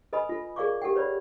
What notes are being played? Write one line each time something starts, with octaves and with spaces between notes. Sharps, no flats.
A4 B4 D#5 G#5 B5 D#6
F4 A4
G#4 A#4 D5 F5 C#6 D6
G4 A4 A#4 F#5 G5
B4 C#5 D5 B5